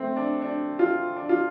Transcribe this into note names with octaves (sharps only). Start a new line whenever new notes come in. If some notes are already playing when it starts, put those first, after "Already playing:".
Already playing: A3 C4
D4
D4
F4
D4
F4